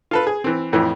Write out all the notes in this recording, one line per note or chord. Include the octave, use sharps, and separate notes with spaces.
F4 A4 B4
G#4
E3 C4
F2 A2 E3